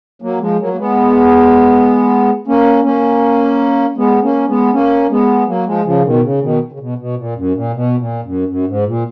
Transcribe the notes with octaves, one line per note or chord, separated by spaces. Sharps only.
F#3 A#3
F3 G#3
F#3 A#3
A#3
G#3 B3
A#3 C#4
A#3 C#4
G#3 B3
A#3 C#4
G#3 B3
A#3 C#4
G#3 B3
F#3 A#3
F3 G#3
C#3 F3
B2 D#3
C#3
B2 D#3
C#3
B2
B2
A#2
F#2
A#2
B2
A#2
F#2
F#2
G#2
A#2